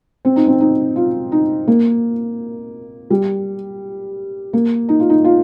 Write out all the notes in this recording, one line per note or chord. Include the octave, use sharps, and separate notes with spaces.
C4
D#4
C4
D#4
F4
D#4
A#3
G3
A#3
D#4
F4
D#4
F4